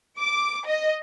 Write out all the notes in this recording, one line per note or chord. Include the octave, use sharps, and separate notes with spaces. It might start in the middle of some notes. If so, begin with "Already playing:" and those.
D6
D#5